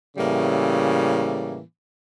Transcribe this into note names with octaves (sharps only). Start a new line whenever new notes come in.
A2 C#3 E3 G3 A#3